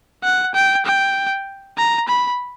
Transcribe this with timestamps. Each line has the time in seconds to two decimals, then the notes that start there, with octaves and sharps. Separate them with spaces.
0.24 F#5
0.55 G5
0.86 G5
1.78 A#5
2.08 B5